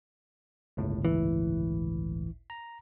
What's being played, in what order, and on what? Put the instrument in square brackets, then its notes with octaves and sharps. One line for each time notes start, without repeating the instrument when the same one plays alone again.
[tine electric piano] G1 C#2 A2
[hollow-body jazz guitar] E3
[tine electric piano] A#5